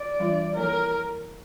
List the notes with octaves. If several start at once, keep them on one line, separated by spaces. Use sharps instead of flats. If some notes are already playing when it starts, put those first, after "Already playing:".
Already playing: D5
E3 G3 D4 F4 C#5
F3 A#3 E4 A4 A#4 C#5